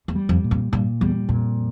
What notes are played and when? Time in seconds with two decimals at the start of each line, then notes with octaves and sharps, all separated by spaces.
0.08 E2
0.15 G3
0.29 F2
0.44 A#2
0.51 F2
0.72 G2 A#2
1.01 E2 G3
1.29 F2 A#2